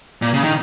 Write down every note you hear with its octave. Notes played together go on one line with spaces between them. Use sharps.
A#2
C#3
D#3